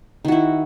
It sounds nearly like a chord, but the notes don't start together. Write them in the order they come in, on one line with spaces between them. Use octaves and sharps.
D#3 F#4 E4